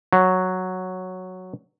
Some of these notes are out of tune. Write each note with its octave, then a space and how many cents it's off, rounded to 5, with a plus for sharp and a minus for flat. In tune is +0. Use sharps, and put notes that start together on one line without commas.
F#3 -5